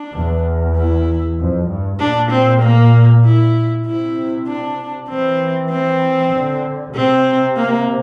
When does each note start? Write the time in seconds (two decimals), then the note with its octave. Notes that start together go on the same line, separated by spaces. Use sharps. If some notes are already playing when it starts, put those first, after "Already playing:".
Already playing: D4
0.15 E2
0.77 E4
1.39 F2
1.70 G2
2.00 A#2 D4
2.31 C4
2.63 A#3
3.24 E4
3.86 C3 E4
4.47 D4
5.09 E3 C4
5.71 C4
6.33 D3
6.95 C3 C4
7.57 A#3